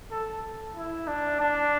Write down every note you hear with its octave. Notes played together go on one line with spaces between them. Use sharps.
A4
E4
D4
D4